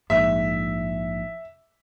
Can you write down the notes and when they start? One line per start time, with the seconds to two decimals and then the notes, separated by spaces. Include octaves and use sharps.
0.10 A#1 G#2 E5